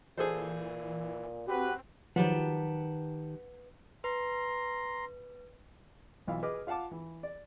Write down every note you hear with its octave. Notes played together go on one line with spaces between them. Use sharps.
A#2 E3 G#4 A4 C5
C4 F#4 G4 B4
D#3 F3 F#3 G4 B4 F#5 A5
B4 A#5 C6
B1 E3 F4 F5
G#4 B4 D#5 D6 F6
F4 F5 F#5 A5 D6
E3
D5